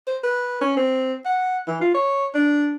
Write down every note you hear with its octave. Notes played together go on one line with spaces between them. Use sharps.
C5
B4
C#4
C4
F#5
E3
F4
C#5
D4